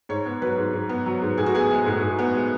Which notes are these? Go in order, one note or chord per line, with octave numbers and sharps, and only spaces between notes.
G#2 C#5
B3
F#3 B4
G#2
G#2
B3
F#3
G#2
A2 G#4
F#4
B3 G#4
G#3
A2
A2
B3
G#3